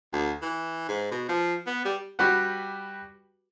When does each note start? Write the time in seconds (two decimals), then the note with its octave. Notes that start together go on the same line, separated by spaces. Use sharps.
0.13 D2
0.42 E3
0.88 G#2
1.11 B2
1.29 F3
1.67 B3
1.85 G3
2.19 G3 F#4 G4 B4 F#5